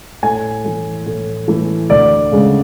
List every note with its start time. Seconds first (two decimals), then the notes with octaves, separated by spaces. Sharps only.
0.23 A2 G#5
0.64 E3 A3
1.06 A2
1.48 E3 A3
1.90 D2 D5
2.32 C#3 G#3